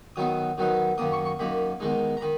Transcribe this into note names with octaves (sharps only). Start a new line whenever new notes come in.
D#3 F#3 B3 D#4 D#6
D#3 F#3 B3 D#4
F#2 D#3 A#3 D#6
C#6
C#6
F#2 D#3 A#3 B5
E2 D#3 G#3 D#4
A#5
D#3 B5